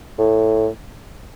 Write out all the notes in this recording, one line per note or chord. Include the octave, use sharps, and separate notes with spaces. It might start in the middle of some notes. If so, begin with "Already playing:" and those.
A2